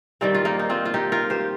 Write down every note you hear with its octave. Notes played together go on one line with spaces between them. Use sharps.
D#3 G3 A#3 C4
F4
A#3 D#4
D#4
C4 F4
F4
D#4 G4
F4 A#4
G4 C5